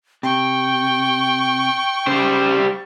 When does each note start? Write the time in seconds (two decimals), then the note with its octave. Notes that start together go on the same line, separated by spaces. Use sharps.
0.23 C3 G5 C#6
2.07 C#3 G3 C5